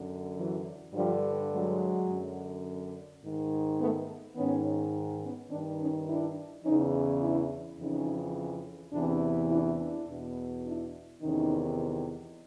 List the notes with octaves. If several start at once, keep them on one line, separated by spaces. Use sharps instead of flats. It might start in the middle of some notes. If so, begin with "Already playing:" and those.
Already playing: F#2 D3
E3 F#3
G2 D3 F3 G3
F#3 G#3
F#2 D3
G#2 D#3
A3 B3
G#2 D#3 B3 C#4
B3 C#4
D#3 C4 D4
G2
C#4 D#4
D4 E4
E2 C#3 E3 C#4 D#4
D4 E4
F2 C#3 E3 C#4 D#4
E2 C3 E3 C4 D4
D4 E4
D4 E4
E2 B2
D4 E4
E2 C3 D#3 C#4 D#4